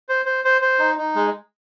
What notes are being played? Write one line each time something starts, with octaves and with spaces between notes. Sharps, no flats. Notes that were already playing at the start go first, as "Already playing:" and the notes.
C5
C5
C5
C5
D#4
D#4
G#3